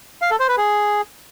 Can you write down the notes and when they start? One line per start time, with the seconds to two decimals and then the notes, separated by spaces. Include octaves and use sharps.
0.22 F5
0.31 A4
0.39 C5
0.48 B4
0.57 G#4